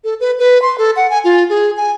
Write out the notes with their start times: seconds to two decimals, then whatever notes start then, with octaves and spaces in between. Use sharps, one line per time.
0.04 A4
0.20 B4
0.39 B4
0.62 C6
0.78 A4
0.96 F#5
1.10 G#5
1.24 F4
1.49 G#4
1.77 G#5